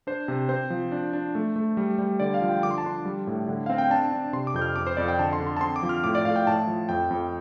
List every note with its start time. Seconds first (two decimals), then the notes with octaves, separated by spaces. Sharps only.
0.07 D4 C5
0.28 C3
0.49 C4 C5
0.70 F3
0.92 D4
1.13 D4
1.35 A3
1.56 A3
1.77 G3
1.99 G3
2.20 D3 D5
2.34 F5
2.41 F3
2.49 G5
2.63 D3 D6
2.71 C6
2.78 A5
2.84 D4 C6
3.05 G3
3.27 A2
3.48 D3
3.66 C4 F5
3.78 G5
3.90 D4 A5
4.12 D4
4.33 C3 C6
4.47 D6
4.54 F2 G6
4.62 F6
4.76 F2 D6
4.87 C5
4.97 F2 D5
5.08 G5
5.19 D3 A5
5.33 C6
5.40 D3
5.47 C6
5.57 A5
5.61 C4 C6
5.76 D6
5.83 F3
5.89 F6
6.04 A2 D6
6.15 D5
6.25 A2 F5
6.36 G5
6.47 A2 A5
6.67 F3
6.89 F2 G5
7.11 F2